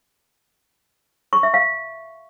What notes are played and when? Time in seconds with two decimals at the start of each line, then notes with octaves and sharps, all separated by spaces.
1.33 C#6
1.43 E5
1.54 F5